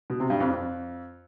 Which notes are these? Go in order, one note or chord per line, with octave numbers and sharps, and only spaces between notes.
B2
C3
G2
F2
F2